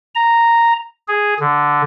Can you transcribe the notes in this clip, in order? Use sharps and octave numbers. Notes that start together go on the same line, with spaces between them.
A#5
G#4
D3